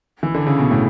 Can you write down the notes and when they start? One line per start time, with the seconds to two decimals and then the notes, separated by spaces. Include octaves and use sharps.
0.23 E3
0.34 D3
0.47 C#3
0.59 B2
0.71 A2